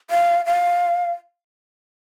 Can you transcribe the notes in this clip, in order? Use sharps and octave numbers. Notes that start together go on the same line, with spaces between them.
F5
F5